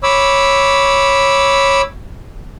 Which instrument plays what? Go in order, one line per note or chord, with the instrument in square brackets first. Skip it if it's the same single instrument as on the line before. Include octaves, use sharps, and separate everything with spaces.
[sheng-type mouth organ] C#5 B5 D6 E6